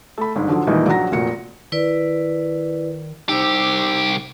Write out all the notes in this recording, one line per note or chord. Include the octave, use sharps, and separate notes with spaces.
A3 B5
G1 G#2
D3 F3 F#3
D#2 A#2 E3 G3 G#3 D#4
A#1 F#3 F#4 A#5 A#6
F1 A#2 F#4 C#7
D#3 E4 B4 D5
C2 D#4 G4 C5 D6 E6